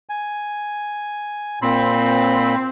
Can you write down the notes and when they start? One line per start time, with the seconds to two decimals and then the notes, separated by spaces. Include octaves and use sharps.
0.09 G#5
1.62 A#2 C4 B5